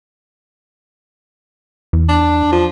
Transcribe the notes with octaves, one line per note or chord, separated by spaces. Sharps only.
E2
D4
F3